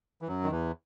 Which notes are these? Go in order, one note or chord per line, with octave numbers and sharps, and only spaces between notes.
E3
F#2 F#3
D#3
E2 E3